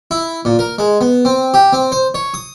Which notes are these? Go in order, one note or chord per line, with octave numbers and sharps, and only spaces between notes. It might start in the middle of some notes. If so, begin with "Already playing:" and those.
E4
A#2
A#4
G#3
B3
C4
G4
C4
C5
C#5
D#6